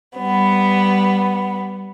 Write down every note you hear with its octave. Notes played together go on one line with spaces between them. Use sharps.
G3 B3